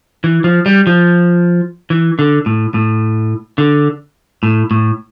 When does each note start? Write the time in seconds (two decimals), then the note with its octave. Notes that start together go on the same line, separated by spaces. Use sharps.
0.24 E3
0.44 F3
0.66 G3
0.87 F3
1.90 E3
2.19 D3
2.46 A2
2.74 A2
3.58 D3
4.43 A2
4.71 A2